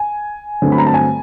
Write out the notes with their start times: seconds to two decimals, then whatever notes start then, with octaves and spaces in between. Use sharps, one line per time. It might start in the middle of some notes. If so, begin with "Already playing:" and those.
Already playing: G#5
0.62 G2 D3 F#3 A3 C4
0.72 B5
0.78 A#5
0.87 A5
0.94 G#5